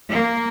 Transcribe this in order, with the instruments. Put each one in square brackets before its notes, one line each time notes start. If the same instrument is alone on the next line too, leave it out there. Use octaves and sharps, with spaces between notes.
[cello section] A#3